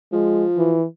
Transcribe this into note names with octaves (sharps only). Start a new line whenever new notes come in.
F3 G#3
E3